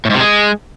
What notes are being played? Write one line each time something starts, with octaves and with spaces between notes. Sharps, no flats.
A2
G#2
C3
G#3